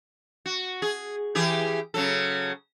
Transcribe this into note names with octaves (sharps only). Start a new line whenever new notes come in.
F#4
G#4
E3 G4 G#4
C#3 F#3 A4